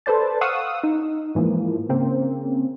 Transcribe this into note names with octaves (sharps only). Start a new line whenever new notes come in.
A4 B4 C5 D5 A5
F5 F#5 C#6 D#6 E6 F#6
D#4
G#2 E3 F3 A#3
C#3 A#3 C4